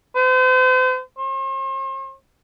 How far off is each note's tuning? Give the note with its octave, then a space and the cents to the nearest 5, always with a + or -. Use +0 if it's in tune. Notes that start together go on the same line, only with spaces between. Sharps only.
C5 -40
C5 +45